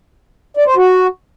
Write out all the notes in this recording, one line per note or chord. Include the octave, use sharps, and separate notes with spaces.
D5
C5
F#4